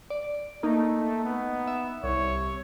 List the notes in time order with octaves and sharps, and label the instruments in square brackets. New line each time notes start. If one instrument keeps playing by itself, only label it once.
[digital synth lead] D5
[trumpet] A3 [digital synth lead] A#3 [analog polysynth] D#4
[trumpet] B3
[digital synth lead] E5
[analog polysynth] C2 [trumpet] C#5